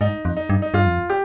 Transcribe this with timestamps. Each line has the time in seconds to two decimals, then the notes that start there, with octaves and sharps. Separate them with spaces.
0.01 G#2 D#4
0.25 F2
0.37 D#4
0.50 G2
0.62 D#4
0.74 G2 F4
0.86 F2
1.10 G4